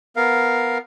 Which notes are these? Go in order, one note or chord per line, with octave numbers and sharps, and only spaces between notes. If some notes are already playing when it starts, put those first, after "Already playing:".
B3 A#4 F5